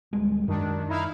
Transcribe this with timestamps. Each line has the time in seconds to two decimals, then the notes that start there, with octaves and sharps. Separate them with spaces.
0.13 D1 G3 G#3
0.48 F#2 D#3 D4
0.88 D#4 E4 F5